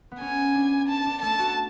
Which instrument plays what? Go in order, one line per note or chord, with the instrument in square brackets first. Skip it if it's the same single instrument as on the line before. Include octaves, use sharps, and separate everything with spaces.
[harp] B3
[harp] C#4 [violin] G#5
[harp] D4
[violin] A5
[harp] D4
[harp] A3 [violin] A5
[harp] F#4